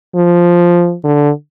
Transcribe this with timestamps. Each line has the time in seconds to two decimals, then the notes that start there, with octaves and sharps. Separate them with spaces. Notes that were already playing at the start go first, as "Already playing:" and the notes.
0.16 F3
1.04 D3